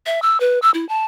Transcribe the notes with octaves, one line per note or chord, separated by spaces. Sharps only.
E5
E6
B4
E6
E4
A5